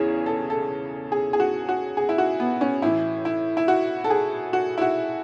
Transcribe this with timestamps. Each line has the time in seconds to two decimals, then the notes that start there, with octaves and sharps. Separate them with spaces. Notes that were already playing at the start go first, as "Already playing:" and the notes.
Already playing: E2 C#3 E3 C#4 G#4
0.26 A4
0.50 A4
1.12 G#4
1.33 G#4
1.40 F#4
1.69 F#4
1.97 G#4
2.09 E4
2.18 F#4
2.40 B3
2.61 C#4
2.82 A2 E3 E4
3.25 E4
3.57 E4
3.68 F#4
4.04 A4
4.10 G#4
4.53 F#4
4.78 E4
4.82 F#4